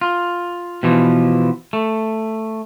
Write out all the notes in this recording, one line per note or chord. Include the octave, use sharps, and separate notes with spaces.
F4
B2 E3 F3
A3